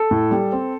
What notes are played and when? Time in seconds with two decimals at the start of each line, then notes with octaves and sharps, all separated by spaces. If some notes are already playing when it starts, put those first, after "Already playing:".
Already playing: A4
0.11 A2
0.31 G3
0.52 C4